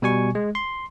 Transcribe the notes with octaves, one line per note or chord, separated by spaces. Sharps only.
B2 G3 G#5 C#6
G#3
C6